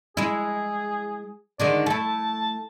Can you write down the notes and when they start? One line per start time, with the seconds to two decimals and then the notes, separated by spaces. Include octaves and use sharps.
0.17 G#3 E4 G#4
1.60 D3 D#3 G#3 D5
1.86 A3 E4 A5